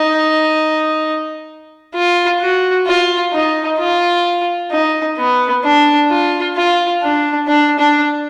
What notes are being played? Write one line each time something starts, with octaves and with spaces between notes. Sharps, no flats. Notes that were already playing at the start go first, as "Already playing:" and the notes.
Already playing: D#4
F4
F#4
F4
D#4
F4
D#4
B3
D4
F4
F4
D4
D4
D4